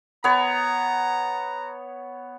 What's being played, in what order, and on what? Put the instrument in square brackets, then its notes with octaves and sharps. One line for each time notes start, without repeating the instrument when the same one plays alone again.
[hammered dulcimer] B3 C#5 [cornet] A#5